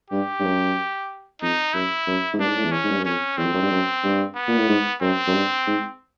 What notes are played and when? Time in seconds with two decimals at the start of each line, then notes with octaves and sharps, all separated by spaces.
0.11 G2 G4
0.40 G2
0.44 F#2
1.42 F2 D#4
1.74 F#2 E4
2.07 F#2
2.34 G#2
2.40 G2 D4
2.47 G#2
2.56 A2
2.64 E2
2.72 C#4
2.84 G#2
2.91 G2
2.98 F#2
3.05 F2 C#4
3.37 E2 C4
3.45 F2
3.53 F#2
3.62 G2
3.70 F#2
4.03 G2
4.35 B3
4.47 A#2
4.57 A2
4.69 G#2
5.01 F#2 C4
5.27 F#2
5.34 G2
5.67 G#2